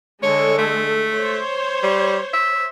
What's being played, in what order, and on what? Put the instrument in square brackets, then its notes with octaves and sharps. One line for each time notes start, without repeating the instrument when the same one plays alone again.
[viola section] D3 G#3 A4 [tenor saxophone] C#5
[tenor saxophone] A3
[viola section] C5 C#5
[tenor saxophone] G3
E5